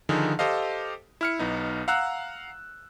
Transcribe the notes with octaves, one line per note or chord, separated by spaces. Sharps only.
D3 D#3 F3 D#4 G#4
G4 A4 C5 D#5 F5
E4 F6 C#7
B1 B3 D#4
F5 F#5 A#5 E6 F#6